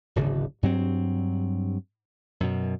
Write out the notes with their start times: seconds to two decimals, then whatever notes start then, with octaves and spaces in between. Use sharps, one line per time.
0.16 D1 G#1 C#3
0.63 G2 F#3 C4
2.40 F#2 B2